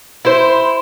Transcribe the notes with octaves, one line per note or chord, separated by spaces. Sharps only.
E4 C5